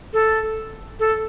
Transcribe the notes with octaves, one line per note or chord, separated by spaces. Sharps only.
A4
A4